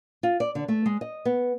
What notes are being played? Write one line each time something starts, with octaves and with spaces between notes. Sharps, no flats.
F4
D5
D3
A3
G#3
D#5
B3